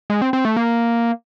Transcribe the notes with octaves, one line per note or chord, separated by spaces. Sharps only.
G#3
C4
C4
A3
A#3